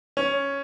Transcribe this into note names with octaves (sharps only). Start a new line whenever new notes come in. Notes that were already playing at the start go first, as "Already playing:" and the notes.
C#4